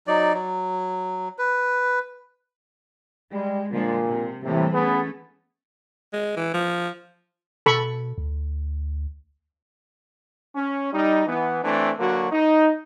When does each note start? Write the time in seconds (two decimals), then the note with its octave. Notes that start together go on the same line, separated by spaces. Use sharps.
0.07 F#3 D#4 D5
0.34 F#3
1.38 B4
3.32 G3 G#3
3.71 A#2 D3 F3 G#3
4.05 C3
4.43 A2 C3 E3 G3 A#3
4.73 A3 B3 C#4 G#4 B4
6.13 G#3
6.36 E3
6.54 F3
7.66 B2 A4 B5 C#6
8.18 D2
10.56 C#4
10.93 G3 D#4
11.27 E3 B3
11.64 E3 A3 C4 D4
11.99 D3 F#3 A#3 F#4
12.32 D#4